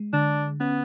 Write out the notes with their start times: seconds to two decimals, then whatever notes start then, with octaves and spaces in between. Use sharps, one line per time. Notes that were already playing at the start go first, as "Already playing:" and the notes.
Already playing: G#3
0.13 D3 D4
0.60 B3 C#4